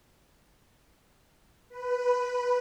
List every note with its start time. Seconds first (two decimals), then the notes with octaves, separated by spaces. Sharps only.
1.69 B4